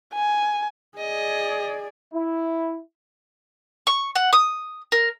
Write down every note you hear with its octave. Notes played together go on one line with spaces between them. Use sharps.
G#5
G#4 D5 D#5
E4
C#6
F#5
D#6
A#4